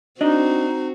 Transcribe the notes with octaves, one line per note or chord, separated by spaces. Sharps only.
C4 D4 D#4 F#4 D#5